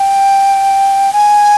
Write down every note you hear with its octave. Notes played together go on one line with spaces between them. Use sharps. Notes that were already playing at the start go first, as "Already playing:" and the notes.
Already playing: G5
G#5